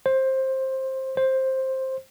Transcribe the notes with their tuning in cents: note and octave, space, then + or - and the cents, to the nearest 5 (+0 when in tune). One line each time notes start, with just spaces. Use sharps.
C5 +15
C5 +10